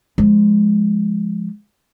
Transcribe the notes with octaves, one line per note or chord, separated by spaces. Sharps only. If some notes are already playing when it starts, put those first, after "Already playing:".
F3 G#3